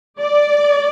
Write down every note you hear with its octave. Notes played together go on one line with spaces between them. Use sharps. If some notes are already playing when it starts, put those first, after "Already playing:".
D5